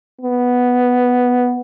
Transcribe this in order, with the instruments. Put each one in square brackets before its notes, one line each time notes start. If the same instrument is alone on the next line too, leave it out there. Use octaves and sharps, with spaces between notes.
[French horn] B3